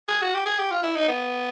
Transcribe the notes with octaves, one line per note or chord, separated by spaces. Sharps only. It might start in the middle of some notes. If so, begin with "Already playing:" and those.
G#4
F#4
G4
G#4
G4
F4
E4
D#4
B3